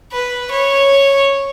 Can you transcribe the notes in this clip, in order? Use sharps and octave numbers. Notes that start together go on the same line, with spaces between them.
B4
C#5